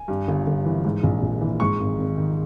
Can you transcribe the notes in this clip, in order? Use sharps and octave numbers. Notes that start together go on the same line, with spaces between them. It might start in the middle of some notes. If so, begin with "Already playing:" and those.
Already playing: G#5
G2
G1
G1
E3
G#2
A#1
A#1
E3
G#2 C#6
G#1
G#1
D#3